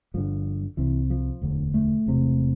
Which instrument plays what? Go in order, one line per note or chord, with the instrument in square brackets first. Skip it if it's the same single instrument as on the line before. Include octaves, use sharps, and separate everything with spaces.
[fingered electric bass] G1 G2 D3 F3
C2 C3 E3
F3
E1 D2 D3
A3
E1 E2 C3